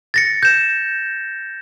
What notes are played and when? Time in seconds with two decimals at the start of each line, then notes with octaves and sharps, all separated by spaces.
0.14 A6 A#6 C#7
0.43 G6 E7